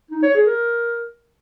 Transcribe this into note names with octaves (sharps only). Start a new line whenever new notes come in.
D#4
C#5
G#4
A#4